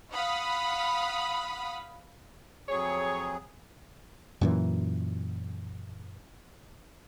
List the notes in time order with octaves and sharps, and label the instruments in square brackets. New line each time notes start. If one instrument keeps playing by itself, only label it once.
[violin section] F5 F#5 B5 D#6
[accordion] F2 F#3 G#4 [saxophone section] C#5
[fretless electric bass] F#2 A#2 E3